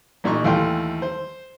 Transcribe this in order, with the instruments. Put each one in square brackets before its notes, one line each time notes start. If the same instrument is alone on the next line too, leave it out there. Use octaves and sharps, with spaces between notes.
[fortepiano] A1 A#2 D#4 C#6
D#2 E3 A3 F5 G5 C6
C5